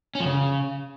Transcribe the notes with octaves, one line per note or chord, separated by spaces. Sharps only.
C#4
F3
C#3